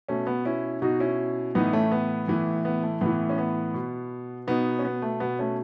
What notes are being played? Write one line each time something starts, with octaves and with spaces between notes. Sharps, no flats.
B2 A3 C#4
B3
C#4 E4
B2 D#4 F#4
C#4 E4
A2 E3 B3 D#4
A3 C#4
B3
A2 E3
B3
A3
A2 E3 B3
C#4
B3
B2
B2 B3 D#4
C#4
B3
A3
B2 B3
A3 C#4